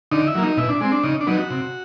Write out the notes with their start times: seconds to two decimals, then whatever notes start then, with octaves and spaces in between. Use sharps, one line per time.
0.12 D3 D#4
0.27 E4
0.35 F#3 A#3
0.43 D#4
0.57 B2 E4
0.69 D4
0.81 G#3 C4
0.92 D4
1.04 C#3 D#4
1.21 D4
1.27 F#3 B3 D#4
1.38 F#4
1.51 C3